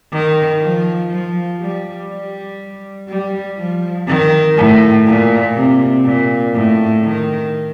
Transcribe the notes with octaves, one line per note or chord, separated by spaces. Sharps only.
D#3
F3
F3
G3
G3
G3
F3
D#3
A2
A#2
C3
A#2
A2
D#3